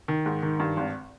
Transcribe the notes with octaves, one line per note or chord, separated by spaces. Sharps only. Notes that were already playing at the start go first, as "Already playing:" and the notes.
D#3
G#2
D#3
G2
G#1